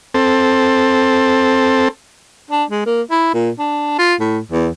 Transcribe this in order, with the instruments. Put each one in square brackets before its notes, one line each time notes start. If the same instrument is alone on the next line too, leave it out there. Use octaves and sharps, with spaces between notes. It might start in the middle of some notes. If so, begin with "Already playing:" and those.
[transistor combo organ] C4 A4
[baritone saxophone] D4
G#3
A#3
E4
A#2
D4
F4
A2
E2